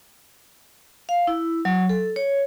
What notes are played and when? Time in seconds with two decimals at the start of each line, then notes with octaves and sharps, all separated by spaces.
1.09 F5
1.27 E4
1.65 F#3
1.89 A4
2.16 C#5